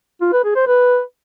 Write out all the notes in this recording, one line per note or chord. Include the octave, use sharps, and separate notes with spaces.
F4
B4
G#4
C5
B4